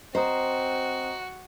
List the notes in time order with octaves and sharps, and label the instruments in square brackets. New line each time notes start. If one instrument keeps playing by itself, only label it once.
[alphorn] C4 [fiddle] F#4 [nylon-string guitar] C5 [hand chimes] D#5 A#5 D#6